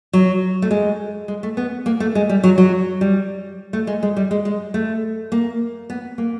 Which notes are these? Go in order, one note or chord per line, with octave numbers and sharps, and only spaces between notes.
F#3
A3
G#3
G#3
A3
B3
A#3
A3
G#3
G3
F#3
F#3
G3
A3
G#3
G#3
G3
G#3
G#3
A3
A#3
B3
A#3